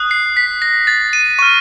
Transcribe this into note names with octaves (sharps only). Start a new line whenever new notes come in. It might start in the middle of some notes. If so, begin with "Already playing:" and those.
Already playing: D#6 F#6
C7
B6
A#6
A6
D#7
C#6 F6 D#7